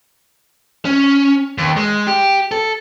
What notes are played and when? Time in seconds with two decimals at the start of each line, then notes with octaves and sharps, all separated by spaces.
0.85 C#4
1.58 D#2
1.77 G#3
2.07 G4
2.52 A4